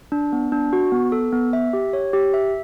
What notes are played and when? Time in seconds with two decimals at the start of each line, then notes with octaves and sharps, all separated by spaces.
0.12 D4
0.33 B3
0.52 D4
0.73 F#4
0.92 B3
1.12 A4
1.32 B3
1.53 E5
1.73 G4
1.93 C#5
2.13 G4
2.34 E5